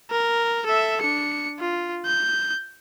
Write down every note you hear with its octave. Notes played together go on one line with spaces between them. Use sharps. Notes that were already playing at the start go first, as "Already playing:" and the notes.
A#4
A4 E5
D4 C#7
F4
G6